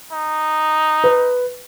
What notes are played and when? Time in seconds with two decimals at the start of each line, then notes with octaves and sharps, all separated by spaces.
0.12 D#4
1.04 B4